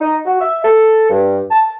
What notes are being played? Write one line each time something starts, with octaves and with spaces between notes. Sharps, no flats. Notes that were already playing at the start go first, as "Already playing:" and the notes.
D#4
F#4
E5
A4
G2
A5